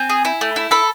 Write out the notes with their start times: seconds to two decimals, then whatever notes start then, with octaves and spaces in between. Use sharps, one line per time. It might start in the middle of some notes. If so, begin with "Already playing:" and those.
Already playing: C4 G#5
0.09 G#4
0.25 E4
0.41 A3
0.56 E4
0.71 A4 B5